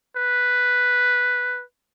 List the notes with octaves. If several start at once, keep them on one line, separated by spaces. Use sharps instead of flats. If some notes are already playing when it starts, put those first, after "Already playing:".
B4